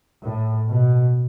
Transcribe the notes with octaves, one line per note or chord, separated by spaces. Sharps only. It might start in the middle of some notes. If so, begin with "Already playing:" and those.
A2
B2